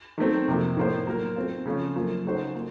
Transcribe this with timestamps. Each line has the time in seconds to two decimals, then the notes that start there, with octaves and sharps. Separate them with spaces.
0.18 D#3 F#3 A3 C4
0.48 F2 C3 F3 A#3
0.77 A2 F3 A#3 F4 C5
1.07 F#3 A#3 F4 A#4
1.36 A3 C4 F4
1.66 C#3 F3 A3 C#4 F4
1.96 F#2 F3 A#3 F4
2.25 C#3 A3 D#4 F#4 C5
2.54 A#3 F4